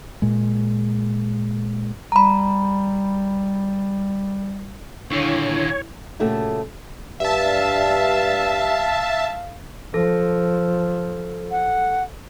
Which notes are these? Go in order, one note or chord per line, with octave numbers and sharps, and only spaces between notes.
A#2 G#3
G3 A#5 B5
D#2 A#2 D3 E4 C#5
A#2 C#3 A3 F#4 G4 A4
G2 E5 F5 A5
F3 A4
F#5